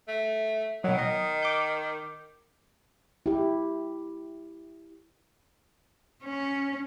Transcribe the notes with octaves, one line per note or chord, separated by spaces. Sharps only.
A3
B2 D#3 F#3
D#5
D6 G6
E4 G4
C#4